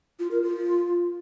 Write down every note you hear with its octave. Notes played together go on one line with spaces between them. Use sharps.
F4
A#4
F4